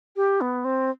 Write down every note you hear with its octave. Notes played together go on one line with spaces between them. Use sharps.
G4
B3
C4